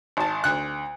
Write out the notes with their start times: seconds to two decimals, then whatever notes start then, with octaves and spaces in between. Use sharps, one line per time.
0.17 G#1 A5
0.44 D2 F#6